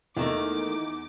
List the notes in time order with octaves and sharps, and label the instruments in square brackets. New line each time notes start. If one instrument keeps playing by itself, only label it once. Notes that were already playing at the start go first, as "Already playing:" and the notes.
[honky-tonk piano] E2 E3 [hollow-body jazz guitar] D#3 A3 A#3 [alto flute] D#4 [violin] D6